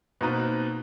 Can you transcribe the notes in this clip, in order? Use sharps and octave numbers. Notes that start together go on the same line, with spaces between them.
B2 A#3 C4 D#4 B4 A#5